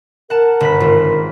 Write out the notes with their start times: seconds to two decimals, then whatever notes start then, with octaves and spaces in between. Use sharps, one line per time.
0.30 A#4 F#5 A5
0.60 G1 B5 B6
0.80 G#1 F4